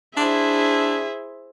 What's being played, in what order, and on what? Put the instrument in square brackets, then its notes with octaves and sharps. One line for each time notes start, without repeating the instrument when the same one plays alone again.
[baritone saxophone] D4 [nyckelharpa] E4 C5 [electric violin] G#4 E5